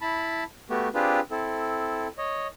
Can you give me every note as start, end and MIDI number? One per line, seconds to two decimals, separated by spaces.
0.01 0.44 64
0.01 0.44 81
0.01 0.44 83
0.70 0.89 57
0.70 0.89 59
0.70 0.89 66
0.70 0.89 67
0.94 1.20 60
0.94 1.20 62
0.94 1.20 65
0.94 1.20 67
0.94 1.20 68
0.94 1.20 71
1.31 2.07 60
1.31 2.07 64
1.31 2.07 69
2.18 2.47 73
2.18 2.47 75